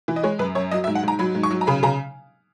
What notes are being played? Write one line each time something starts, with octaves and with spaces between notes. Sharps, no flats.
E3
D#5
G#3 C#5
F#2 B4
F#2 C#5
F#3 D#5
E5
G#2
F#5
G#2 A#5
F#3 B5
G#2
C#6
F#3
A#5
C#3 B5
C#3 A#5